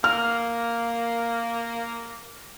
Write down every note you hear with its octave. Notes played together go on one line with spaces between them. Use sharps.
A#3 F6